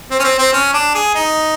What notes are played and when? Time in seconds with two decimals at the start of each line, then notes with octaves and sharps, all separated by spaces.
0.11 C4
0.19 C#4
0.24 C4
0.39 C4
0.53 C#4
0.73 D4
0.94 G#4
1.15 D#4